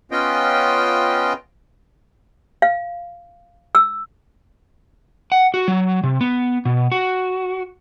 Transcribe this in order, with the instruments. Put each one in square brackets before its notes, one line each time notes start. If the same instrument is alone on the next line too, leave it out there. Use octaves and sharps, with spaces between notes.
[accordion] B3 C#4 F4 D#5 G5
[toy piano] F5
E6
[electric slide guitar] F#5
F#4
F#3
C3
B3
B2
F#4